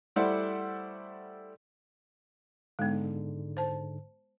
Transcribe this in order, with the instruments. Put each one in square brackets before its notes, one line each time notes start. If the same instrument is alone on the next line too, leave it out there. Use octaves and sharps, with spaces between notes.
[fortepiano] G3 A3 E4 C5 D5 F#5
[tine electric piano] G#2 D3 [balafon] G#3 B3
[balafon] C5 A5